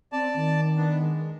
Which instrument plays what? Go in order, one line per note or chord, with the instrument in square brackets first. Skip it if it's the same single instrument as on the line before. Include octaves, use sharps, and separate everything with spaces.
[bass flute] C4 [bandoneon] D5 A5
[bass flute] D#3
[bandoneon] B3 D4
G#3